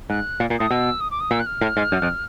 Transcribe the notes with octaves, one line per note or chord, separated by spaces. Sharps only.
G#2 F#6
A#2
A#2
A2 D#6
B2 E6
D#6
D6
D#6
A#2 E6
F#6
F6
A2
G#2
F#2
F2